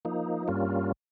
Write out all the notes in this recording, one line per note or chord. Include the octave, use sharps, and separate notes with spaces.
F3 A#3 D#4
G2 G3 A#3 C#4 F4